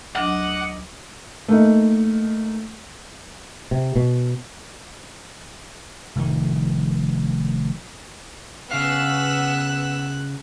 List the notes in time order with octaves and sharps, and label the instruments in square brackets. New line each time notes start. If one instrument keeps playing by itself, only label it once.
[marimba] D2 F#3 D4 [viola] D#5 D6 [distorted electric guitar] F#5
[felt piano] A3 A#3 D#4
[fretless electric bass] C3
B2
[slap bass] F1 F2 A#2 D#3
[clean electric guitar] C#3 F5 [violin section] B3 E6 [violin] F#6